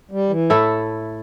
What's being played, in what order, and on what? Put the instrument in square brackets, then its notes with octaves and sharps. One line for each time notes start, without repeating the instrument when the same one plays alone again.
[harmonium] G3
E3
[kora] A2 A3 E4 A4